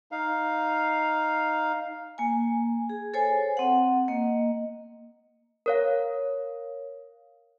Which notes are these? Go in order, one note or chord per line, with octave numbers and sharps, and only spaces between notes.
D#4 F5
A#3 G#5
G#4
A4 C5 C#5 G#5
C4 F#5
A#3 D#5
A#4 C#5 F5